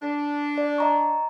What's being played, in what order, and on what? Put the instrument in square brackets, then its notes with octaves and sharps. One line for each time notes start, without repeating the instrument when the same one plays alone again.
[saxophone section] D4
[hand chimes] D5
D#5 A#5 C#6